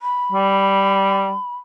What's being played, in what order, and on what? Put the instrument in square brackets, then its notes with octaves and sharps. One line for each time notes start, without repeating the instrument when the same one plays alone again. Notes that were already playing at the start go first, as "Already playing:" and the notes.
[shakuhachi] B5
[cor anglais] G3